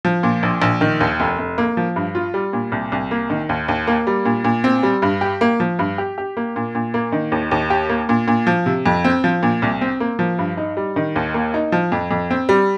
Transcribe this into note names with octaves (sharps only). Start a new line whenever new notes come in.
F3
A#2
A#1
A#1
D#3
D#2
F1
F1
A#3
F3
G2
F4
G3
A#2
C2
C2
A#3
D#3
D#2
D#2
A#3
G3
A#2
A#2
C4
G3
G2
G4
A#3
F3
G2
G4
G4
A#3
A#2
A#2
A#3
D#3
D#2
D#2
G4
A#3
A#2
A#2
F3
C3
F2
C4
F3
A#2
C2
C4
A#3
F3
G2
D#4
G3
D#3
D#2
A#3
D#4
F3
F2
F2
C4
G3